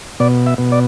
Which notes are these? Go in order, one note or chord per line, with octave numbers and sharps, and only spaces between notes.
B2 D5
E5
B2
D5